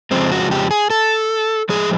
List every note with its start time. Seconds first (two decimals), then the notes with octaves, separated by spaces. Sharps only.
0.11 F2 C#3 F3 G#3 C4
0.32 F#4
0.51 G4
0.71 G#4
0.90 A4
1.69 A2 F3 G#3 G#4